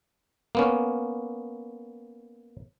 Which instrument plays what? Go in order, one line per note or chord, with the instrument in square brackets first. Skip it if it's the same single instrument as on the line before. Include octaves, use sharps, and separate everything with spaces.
[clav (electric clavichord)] A#3 B3 C#4